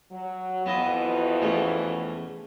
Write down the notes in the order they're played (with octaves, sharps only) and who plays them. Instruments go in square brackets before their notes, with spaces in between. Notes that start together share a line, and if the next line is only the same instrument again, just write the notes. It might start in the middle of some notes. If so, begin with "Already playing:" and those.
[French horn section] F#3
[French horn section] F2 B2 E3 [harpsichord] B3 E4 D#5
[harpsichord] E2 A3 C#4